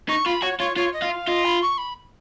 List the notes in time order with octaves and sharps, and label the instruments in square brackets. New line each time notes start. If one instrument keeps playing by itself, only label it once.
[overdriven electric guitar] D#4 [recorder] C#6
[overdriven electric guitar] F4 [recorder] B5
[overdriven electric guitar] F#4 [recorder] C#5
[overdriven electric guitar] F4 [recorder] C#5
[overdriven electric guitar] F4 [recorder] C#5
[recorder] D#5
[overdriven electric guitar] F4
[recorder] F5
[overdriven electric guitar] F4 [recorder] D#5
[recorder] B5
C#6
B5